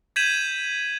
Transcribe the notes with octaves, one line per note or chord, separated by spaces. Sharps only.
G6 G#6 B6 D#7 E7 F#7